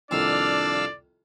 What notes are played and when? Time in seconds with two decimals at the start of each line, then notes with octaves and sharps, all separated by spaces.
0.11 C2 F2 D#3 D4 D5 F5 E6 F6